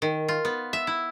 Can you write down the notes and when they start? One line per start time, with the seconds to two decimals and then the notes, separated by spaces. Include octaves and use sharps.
0.02 D#3
0.28 F4
0.45 B3
0.73 E5
0.87 E4